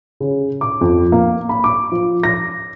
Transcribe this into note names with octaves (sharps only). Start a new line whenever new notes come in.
C#3
D6
F2
A#3
B5
D6
F3
A#6